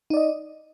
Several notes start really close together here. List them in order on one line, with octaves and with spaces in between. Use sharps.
D#4 D5 D#5